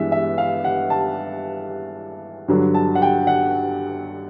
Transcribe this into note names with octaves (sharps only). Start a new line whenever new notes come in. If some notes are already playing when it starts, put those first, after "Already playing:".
Already playing: G2 E3 G#3 B3 D4 E5
E5
F5
F#5
A5
G2 D3 F#3
A5
F#5
G5
F#5